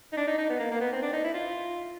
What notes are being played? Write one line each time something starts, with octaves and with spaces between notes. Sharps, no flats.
D#4
D4
D#4
D#4
B3
A#3
A#3
B3
C4
D4
D#4
E4
F4